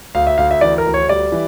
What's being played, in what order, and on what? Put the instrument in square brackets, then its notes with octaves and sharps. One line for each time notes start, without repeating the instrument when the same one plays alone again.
[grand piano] D2 F5
E5
D2 F5
E5
E3 D5
A#4
D2
C#5
G3 D5
E3